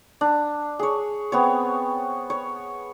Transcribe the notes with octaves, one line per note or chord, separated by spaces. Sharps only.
D4
G#4 C#5
B3 C4 C#5
C#5